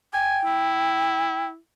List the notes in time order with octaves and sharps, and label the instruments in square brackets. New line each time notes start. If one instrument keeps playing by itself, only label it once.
[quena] G5 [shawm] G#5
[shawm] E4